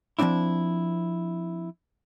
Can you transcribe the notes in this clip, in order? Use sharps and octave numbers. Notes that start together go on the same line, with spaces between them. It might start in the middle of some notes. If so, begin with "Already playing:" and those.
F3 A#3 C4 D4 E4